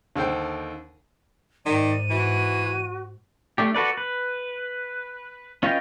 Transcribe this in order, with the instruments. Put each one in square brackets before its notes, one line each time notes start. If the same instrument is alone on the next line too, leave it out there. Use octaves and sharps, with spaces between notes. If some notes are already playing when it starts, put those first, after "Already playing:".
[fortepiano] D#2 D3 A4 C5 G5
[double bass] G#2 [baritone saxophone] D#3 [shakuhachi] D5 [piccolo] D#7
[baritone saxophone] E3 [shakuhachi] F#4
[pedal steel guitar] A3 D4 G4
F#4 A4 B4 D5
B4
C#4 F4 B4 D#5 G5